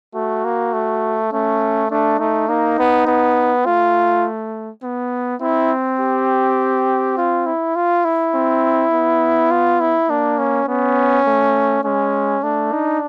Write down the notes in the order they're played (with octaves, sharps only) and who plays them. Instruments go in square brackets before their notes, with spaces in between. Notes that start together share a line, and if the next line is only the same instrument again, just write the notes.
[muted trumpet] A3 [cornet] F#4
[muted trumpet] A#3
A3
[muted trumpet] A3 [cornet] C#4
[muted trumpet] A3 [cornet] D4
[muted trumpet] A3 [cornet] D#4
[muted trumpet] A#3 [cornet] D#4
[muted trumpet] B3
B3
[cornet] A3 [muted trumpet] F4
[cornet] B3
[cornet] C4 [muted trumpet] E4
[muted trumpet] G4
F4
E4
F4
E4
[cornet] C4
B3
[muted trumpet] F4
E4
[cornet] A#3 [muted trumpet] D4
[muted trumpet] C#4
[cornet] B3 [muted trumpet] C#4
[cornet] A3
[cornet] G#3 [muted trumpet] C#4
[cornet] A3 [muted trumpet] D4
[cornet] D#4